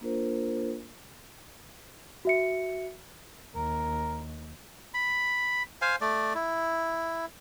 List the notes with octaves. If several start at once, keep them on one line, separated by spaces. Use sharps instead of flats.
A#3 D4 F4 A#4 C5
F#4 E5 C#7
D#2 A#4
B5
C5 F5 G#5
A3 D5
E4